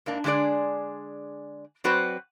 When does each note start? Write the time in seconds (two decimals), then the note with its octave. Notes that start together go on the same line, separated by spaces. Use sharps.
0.06 G#2 A#3 D4
0.24 D3 G#3 D4 G#4 D5
1.84 F#3 C4 F#4 B4 C5 D5